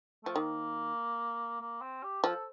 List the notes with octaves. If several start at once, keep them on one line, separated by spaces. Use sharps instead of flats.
F3 A3
D#3 A#3
A#3
C4
G4
F3 A4